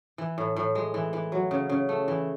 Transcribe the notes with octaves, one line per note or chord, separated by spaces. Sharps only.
E3
A2
A2
G#3
E3
E3
F#3
C#3
C#3
A3
E3